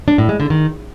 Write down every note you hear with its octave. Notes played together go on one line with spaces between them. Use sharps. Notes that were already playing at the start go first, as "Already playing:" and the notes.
D4
A2
G#3
D3
D#3